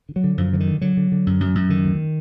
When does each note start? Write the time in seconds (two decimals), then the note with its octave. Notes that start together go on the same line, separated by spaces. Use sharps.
0.09 D3
0.16 F#3
0.24 D3
0.38 F#2 F3
0.53 D3 F3
0.60 D#3
0.68 D3
0.81 D3 F#3
0.97 D3
1.12 D3
1.27 F#2
1.40 F#2
1.55 F#2
1.69 D3 D#3
1.84 D2